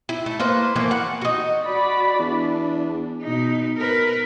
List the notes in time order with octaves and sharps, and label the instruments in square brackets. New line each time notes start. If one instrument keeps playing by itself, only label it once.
[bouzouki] E4
A3
A#3 B4 C5
E3 F3 A3 A#3
F#5
D#4 F#4
[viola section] F#4 D5 B5
[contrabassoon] E2 [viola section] D4
[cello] B2 D#4
A#4 B4